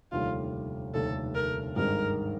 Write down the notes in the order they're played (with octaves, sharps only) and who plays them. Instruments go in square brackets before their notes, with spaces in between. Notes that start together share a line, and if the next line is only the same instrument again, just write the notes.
[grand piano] F1 D#2 D3 G3 [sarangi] F4
[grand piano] F1 D#2 D3 G3 [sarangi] A4
[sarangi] A#4
[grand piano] G#1 G2 D#3 G#3 [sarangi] A#4